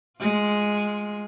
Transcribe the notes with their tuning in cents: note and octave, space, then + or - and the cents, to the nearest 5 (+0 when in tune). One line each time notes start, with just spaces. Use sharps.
G#3 +0 F4 +10